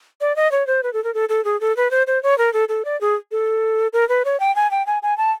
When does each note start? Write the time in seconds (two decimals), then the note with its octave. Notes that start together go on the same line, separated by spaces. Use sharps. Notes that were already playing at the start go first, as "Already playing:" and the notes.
0.21 D5
0.36 D#5
0.52 C#5
0.67 C5
0.83 B4
0.93 A4
1.04 A#4
1.14 A4
1.29 A4
1.45 G#4
1.61 A4
1.77 B4
1.91 C5
2.07 C5
2.23 C#5
2.38 A#4
2.53 A4
2.69 A4
2.85 D5
3.01 G#4
3.32 A4
3.93 A#4
4.09 B4
4.25 C#5
4.40 G5
4.56 G#5
4.71 G5
4.87 G#5
5.03 G#5
5.18 A5